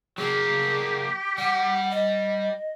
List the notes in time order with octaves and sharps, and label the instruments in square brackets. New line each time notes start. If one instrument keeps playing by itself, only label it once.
[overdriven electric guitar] F#3 A#3 [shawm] G4 [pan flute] G#4
[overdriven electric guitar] G3 [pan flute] F#5
[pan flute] D#5